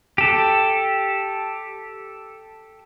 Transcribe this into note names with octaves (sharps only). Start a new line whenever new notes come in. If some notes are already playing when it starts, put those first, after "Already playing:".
G4 A4